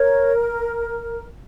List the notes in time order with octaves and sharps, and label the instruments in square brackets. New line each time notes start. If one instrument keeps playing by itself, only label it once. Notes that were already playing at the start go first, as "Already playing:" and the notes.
Already playing: [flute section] A#4 [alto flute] C#5